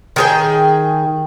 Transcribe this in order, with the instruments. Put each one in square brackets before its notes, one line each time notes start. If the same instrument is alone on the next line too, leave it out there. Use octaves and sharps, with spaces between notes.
[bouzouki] D#3 G#4 G5